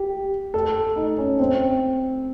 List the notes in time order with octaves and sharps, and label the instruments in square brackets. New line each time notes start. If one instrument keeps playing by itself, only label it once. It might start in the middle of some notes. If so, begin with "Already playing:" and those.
Already playing: [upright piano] G4
A4
D#4
C#4
C4